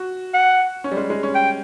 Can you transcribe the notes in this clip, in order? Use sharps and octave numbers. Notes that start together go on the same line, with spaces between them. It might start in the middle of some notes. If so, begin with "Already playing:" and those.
Already playing: F#4
F#5
C#4
G3
G#3
G#3
C#4
G5